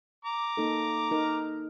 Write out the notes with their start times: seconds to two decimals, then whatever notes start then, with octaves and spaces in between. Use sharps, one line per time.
0.25 A#5 D6
0.57 A#3 D#4 A4
1.11 D#4 A#4